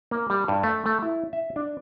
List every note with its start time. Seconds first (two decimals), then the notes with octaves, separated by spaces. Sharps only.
0.11 A#3
0.30 G3
0.48 G2
0.63 A3
0.86 A3
1.02 E4
1.33 E5
1.56 D4